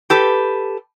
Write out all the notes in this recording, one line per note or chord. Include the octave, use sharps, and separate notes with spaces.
G4 A4 B4